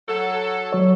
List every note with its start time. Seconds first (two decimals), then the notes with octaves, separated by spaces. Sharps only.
0.09 F#3 A4
0.73 F#3 C#5